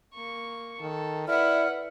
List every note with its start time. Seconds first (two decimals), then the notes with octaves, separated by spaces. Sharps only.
0.14 A#3 C#6
0.81 D#3 A4
1.28 E4 B4 D5 F#5 F6